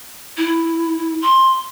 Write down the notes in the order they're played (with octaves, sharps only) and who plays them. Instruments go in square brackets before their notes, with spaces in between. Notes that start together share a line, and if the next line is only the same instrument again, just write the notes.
[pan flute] E4
C6